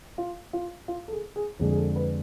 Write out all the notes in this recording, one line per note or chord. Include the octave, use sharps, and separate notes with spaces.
F4
F4
F4
A4
G#4
G#4
F2 D3 G#3 G#4
G#4
A4
B4